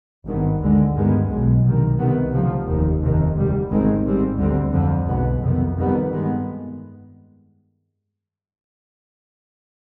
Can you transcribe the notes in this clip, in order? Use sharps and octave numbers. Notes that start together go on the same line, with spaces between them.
G#1 G2 D#3 B3
D2 D3 G#3
G2 D#3 G#3 B3
B1 B2 G#3
C2 C3 D#3
C2 C3 D#3 B3
D2 C3 F3
F1 D#2 D#3
F1 F2 C3 D#3
D2 C3 G3
G#1 G#2 D#3 G#3 C4
G#1 G#2 G3 C4
D2 D3 G3 C4
F2 D3 F3
B1 B2 G#3 B3
F2 C3 D#3 B3
F2 D#3 G3 B3
G2 D#3 G#3 B3